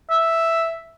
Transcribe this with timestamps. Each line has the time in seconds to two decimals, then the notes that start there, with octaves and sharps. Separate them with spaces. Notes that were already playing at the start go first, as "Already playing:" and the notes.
0.10 E5